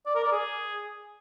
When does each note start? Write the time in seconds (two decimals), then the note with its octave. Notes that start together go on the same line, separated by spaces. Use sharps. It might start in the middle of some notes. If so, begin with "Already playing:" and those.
0.06 D5
0.15 A#4
0.23 D5
0.32 G#4